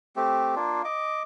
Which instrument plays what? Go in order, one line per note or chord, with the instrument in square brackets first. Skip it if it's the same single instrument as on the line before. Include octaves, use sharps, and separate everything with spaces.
[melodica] A3 C4 G4
A#3 D4 F4
D#5 D6